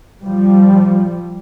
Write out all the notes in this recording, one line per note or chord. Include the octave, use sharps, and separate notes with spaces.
F3 G3